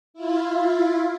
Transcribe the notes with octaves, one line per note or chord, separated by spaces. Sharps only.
E4 F4